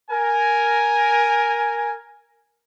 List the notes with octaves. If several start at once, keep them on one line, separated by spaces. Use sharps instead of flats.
A#4 G#5